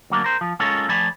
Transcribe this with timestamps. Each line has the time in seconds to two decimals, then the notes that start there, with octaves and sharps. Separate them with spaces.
0.10 D2 F#3 A#3 D4
0.24 A#4 C5
0.41 F3
0.60 G#3 C#4 F4 A4 A#4 C#5
0.89 F3 A3 D5 G#5 B5